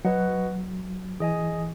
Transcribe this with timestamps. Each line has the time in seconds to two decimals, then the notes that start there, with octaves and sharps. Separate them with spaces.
0.05 F#3 F#4 B4 D#5 F#5
1.20 E3 G#4 D#5 G#5